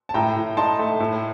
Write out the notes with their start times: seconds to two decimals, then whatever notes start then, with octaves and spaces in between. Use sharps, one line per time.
0.09 A5
0.14 A2 G5 A#5
0.36 A2
0.57 D#4 A5 C6
0.79 A3
1.00 A2